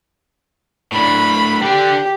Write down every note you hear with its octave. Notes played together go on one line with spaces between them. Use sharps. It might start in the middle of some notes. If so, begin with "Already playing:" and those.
A2 D4 B5
D3 D4 G4